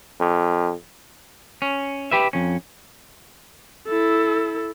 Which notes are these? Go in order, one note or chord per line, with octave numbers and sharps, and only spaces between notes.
F2
C#4
G4 B4 E5
F2 C#4
E4 A4